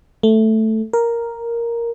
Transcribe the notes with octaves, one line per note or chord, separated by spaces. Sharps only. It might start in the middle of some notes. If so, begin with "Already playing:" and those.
A3
A#4